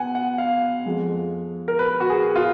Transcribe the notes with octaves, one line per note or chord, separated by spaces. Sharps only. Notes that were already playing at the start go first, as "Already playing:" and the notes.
Already playing: B3 F#5 G#5
F#5
F5
F2 F3 G#3
A#4
B4
F#4
G#4
F4